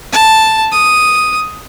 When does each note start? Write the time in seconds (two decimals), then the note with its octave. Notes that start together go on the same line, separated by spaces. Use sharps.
0.12 A5
0.72 D#6